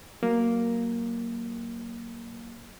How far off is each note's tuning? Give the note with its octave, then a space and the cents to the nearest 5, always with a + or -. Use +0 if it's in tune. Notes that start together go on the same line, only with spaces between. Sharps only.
F#3 +20 A#3 +0